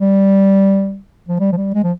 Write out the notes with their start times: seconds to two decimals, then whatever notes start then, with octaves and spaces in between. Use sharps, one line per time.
0.01 G3
1.29 F3
1.40 G3
1.52 F3
1.57 G3
1.74 G#3
1.83 F3